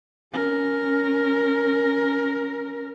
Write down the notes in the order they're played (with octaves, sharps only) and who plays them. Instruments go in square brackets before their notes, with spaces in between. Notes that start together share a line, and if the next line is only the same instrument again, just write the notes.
[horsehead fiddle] C#4 A#4